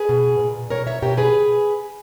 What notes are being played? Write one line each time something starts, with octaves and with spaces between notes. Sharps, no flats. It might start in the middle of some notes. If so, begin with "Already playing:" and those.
Already playing: G#4 B4
B2
A#2
B2 A#4 C#5
C#5 E5
B2 G4 A#4
G#4 B4